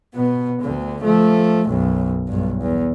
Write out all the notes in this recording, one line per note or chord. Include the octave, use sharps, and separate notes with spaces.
B2 B3
D2 D3
F3 A3
B1 F#2
B1 G2
E2